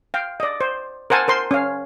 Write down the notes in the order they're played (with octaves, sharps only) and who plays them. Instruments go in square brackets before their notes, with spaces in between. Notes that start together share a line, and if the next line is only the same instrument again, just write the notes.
[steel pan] F5 G5
D5 D#5
C5
A#4 C5 F#5 G#5 A5
A#4 C5 C6
C#4 F5